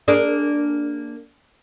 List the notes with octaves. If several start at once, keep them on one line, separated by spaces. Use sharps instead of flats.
A#3 D4 G#4